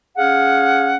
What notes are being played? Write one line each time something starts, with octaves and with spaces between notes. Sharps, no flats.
C#4 G#4 F5 F#5